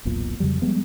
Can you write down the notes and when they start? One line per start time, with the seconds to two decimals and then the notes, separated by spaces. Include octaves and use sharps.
0.05 E1 B1 E2 A#2
0.40 F2 C#3 F#3 G3
0.62 F3 G3 G#3 B3